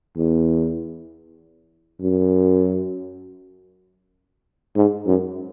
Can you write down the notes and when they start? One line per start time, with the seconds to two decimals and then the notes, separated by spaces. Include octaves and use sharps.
0.17 E2
2.01 F#2
4.76 G#2
5.07 F#2